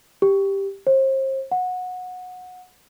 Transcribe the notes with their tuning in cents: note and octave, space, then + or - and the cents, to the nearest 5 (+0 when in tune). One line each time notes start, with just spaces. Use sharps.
G4 +5
C5 +35
F#5 -20